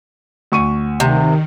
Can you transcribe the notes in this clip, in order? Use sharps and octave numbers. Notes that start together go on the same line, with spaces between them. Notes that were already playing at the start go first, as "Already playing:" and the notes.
D2 C#6 D#7
C3 D#3